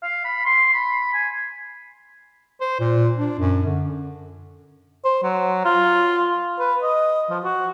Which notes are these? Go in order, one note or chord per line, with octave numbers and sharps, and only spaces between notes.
F5
B5
C6
B5
G#5
C5
A#2
D4
F#2
D3
C5
F#3
F4
B4
D#5
F3
F#4